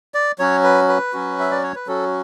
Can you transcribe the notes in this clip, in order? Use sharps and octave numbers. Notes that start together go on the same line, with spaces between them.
D5
F#3 C#4 F#4 C#5
B4
B4
F#3 C#4 F#4
E5
D5
C#5
B4
F#3 C#4 F#4 A4